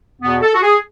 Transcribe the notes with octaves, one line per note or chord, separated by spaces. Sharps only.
E2 B2 B3
A4
F#4
G#4